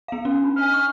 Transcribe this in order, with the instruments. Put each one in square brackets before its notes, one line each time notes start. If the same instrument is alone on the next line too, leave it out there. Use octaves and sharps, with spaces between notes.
[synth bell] B3 F5
C#4
[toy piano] D4 D#4 B5
[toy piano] C5 D#5 G#5 [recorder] F6
[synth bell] C#6